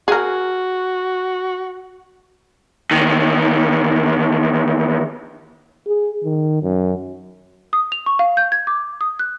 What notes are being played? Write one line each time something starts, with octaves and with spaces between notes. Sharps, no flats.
F#4 G#4 A#4
E2 D#3
G#4
D#3
F#2
D#6
F7
C#6
F5
G6
G#6
D6
D#6
F#6